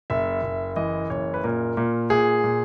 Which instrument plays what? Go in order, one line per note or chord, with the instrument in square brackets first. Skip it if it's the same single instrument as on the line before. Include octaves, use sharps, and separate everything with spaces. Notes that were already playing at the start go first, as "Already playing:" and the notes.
[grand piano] F#1 E5
F#1
E3 D#5
F#1 C#5
B4
A#2 A#4
A#2
A#2 G#4
A#2